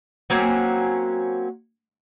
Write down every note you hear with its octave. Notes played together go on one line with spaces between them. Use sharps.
F#3 A#3 C4 C#4